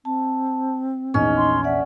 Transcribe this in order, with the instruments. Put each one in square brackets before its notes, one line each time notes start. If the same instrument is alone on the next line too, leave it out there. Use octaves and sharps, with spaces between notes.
[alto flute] C4 [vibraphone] A5
[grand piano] A#1 E2 [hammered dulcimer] C#4 [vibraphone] D#4 D#5
[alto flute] C6
[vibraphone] D5 F#5 [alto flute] E5